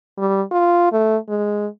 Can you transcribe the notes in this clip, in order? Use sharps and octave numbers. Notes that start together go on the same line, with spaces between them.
G3
F4
A3
G#3